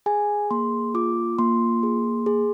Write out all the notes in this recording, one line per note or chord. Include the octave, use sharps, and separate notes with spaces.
G#4 G#5
A#3 C6
F4 D6
A#3 C6
G#4
G#4